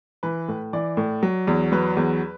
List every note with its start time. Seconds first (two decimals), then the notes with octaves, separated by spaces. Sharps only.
0.23 E3 B4
0.48 A2
0.73 E3 D5
0.97 A2
1.23 F#3
1.47 E2
1.72 F#3 B4
1.97 E2